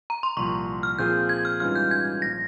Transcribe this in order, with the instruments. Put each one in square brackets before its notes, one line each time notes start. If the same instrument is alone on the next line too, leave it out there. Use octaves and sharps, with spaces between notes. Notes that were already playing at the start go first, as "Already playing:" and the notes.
[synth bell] A#5
C6
[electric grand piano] C2 A#2 F3 [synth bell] C#6
[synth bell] F6
[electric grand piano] A#2 F3 C4 F4 G#4 [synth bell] G6
[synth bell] G#6
F6
[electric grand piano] G#2 E3 G3 C#4 F4 [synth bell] F6
[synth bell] G6
G#6
[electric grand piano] A#1 F3 [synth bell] A#6